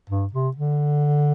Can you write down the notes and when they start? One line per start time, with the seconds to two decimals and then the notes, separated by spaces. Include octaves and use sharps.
0.10 G2
0.33 C3
0.56 D3